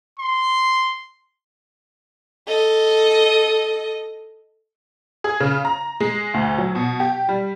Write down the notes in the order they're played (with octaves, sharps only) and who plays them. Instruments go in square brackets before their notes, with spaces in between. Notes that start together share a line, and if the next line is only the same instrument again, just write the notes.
[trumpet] C6
[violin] A4 D#5
[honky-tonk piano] G#4
C#3
A#5
G#3
D2
F#3
B2
G4
G3